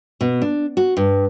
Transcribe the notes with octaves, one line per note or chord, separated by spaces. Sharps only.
B2
D4
F#4
G2